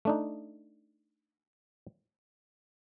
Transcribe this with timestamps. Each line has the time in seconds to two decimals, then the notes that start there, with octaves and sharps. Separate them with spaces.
0.05 A3 D4 D#4